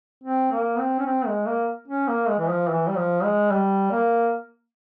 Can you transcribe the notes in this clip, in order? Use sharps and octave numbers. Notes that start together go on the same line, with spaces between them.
C4
A#3
C4
C#4
C4
G#3
A#3
C#4
A#3
G#3
E3
F3
E3
G3
F3
G#3
G3
A#3